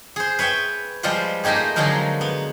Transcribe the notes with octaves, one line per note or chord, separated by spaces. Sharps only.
G#4 C5
B4 C#5 E5 G5
F3 G3 G#3 F4 G4 C5
A3 A#3 D#4 G4 G#4
D3 F3 F#3 G#3 D#4 A#4
B3